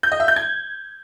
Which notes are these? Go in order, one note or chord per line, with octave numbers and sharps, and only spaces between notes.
G6
D#5
E5
G6
G#6